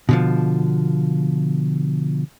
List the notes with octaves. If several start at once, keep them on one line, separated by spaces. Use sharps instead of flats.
B2 D3 F3